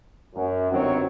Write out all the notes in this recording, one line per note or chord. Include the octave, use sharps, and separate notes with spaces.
F#2
G1 F#2 D#3 F#3 C4 C#5